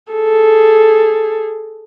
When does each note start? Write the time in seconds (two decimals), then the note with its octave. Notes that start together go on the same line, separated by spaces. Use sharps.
0.12 G#4 A4